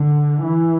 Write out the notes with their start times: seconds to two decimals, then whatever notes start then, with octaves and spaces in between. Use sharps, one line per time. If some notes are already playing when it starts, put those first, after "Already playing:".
Already playing: D3
0.44 E3